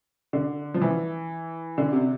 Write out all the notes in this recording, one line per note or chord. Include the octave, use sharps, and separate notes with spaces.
D3
F3
E3
D3
C3